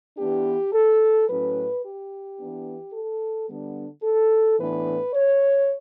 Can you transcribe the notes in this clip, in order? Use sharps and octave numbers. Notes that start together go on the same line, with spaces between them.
E3 B3 D4 G4
A4
A2 F#3 A3 C#4 B4
G4
E3 B3 D4
A4
D3 G3 B3 D4
A4
A2 E3 B3 D4 B4
C#5